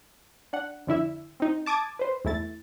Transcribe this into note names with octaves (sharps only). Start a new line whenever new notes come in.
D4 F#5
F2 D3 E4 E5
C4 D#4
A5 D6 D#6 G#6 A6
B4 C5
E2 A3 E4 A6